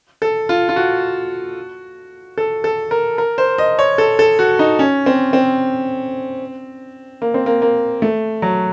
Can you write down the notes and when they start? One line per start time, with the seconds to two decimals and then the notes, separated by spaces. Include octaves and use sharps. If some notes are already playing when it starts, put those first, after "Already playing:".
0.22 A4
0.49 F4
0.69 F4
0.76 F#4
2.38 A4
2.64 A4
2.91 A#4
3.18 A#4
3.38 C5
3.58 D#5
3.79 C#5
3.98 A4
4.19 A4
4.39 F#4
4.59 D#4
4.79 C#4
5.06 C4
5.33 C4
7.22 A#3
7.34 C4
7.46 A#3
7.62 A#3
8.02 A3
8.42 F#3